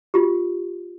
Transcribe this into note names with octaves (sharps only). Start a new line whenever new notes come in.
F4 G4